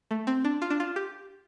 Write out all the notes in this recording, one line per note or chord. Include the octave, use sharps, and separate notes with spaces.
A3
C4
D4
F4
D4
F4
G4